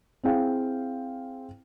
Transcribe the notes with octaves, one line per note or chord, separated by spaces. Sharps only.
C4 E4 G#4 F5 G5